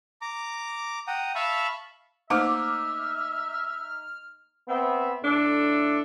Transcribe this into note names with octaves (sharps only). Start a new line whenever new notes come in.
A#5 D6
F#5 G5 A#5 D#6
E5 F5 A5 B5 C#6
A3 A#3 D#4 C5 E5 D6 F6
B3 C4 E5
A2 D4 A4